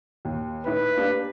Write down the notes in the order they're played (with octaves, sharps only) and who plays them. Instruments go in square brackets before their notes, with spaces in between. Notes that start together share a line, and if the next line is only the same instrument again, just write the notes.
[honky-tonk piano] D#2
[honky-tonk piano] A2 D#4 E4 [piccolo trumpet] B4
[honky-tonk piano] A#3 D4 G4